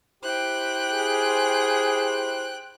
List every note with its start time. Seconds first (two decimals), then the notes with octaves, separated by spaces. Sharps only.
0.23 E4 G4 C5 G5 F#6
0.92 G#4